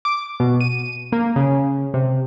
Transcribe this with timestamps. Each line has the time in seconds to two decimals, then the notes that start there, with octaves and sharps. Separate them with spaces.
0.05 D6
0.40 B2
0.61 D#7
1.12 A#3
1.36 C#3
1.94 C3